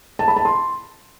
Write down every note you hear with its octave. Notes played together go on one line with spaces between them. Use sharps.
A5
B5
A5
C6